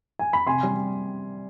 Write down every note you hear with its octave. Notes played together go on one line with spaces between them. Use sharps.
G#5
B5
C3 G#5 C6
G3